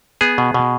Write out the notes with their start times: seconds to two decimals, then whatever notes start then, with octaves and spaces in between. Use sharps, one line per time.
0.21 B3 G#4
0.38 B2
0.54 B2